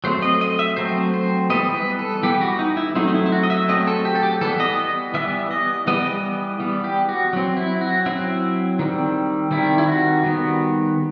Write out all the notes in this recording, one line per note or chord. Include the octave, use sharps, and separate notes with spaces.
F#3 A3 C4 C5
D#5
D#5
E5
F#3 A3 C4 C5
C5
E3 G3 B3 D#5
B4
A4
E3 G3 B3 G4
F#4
D#4
E4
F#3 A3 C4 D#4
D#4
E4
E4
F#4
D#5
E5
F#3 A3 C4 D#5
A4
G4
A4
G4
E3 G3 B3 A4
D#5
D#5
E3 G3 B3 E5
D#5
E3 G3 B3 D#5
D#5
E3 G3 B3
G4
F#4
F#3 C4
E4
F#4
F#3 C4 E4
D#3 G3 C4
D#3 G3 C4 E4
E4
F#4
D#3 G3 B3